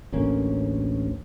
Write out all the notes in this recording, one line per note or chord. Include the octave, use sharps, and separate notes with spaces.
A1 D2 A#3 C#4